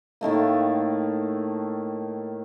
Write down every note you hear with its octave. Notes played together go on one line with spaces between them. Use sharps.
A2 D#3 A3 A#3